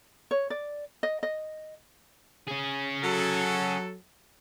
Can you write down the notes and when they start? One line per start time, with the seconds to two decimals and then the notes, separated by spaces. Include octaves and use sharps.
0.31 C#5
0.50 D5
1.03 D#5
1.23 D#5
2.48 C#4 G#4
3.02 F#3 A4